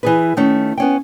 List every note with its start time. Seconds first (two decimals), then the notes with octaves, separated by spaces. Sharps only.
0.03 E3 G#4 B4
0.37 D#3 A3 C#4
0.78 B3 C#4 G5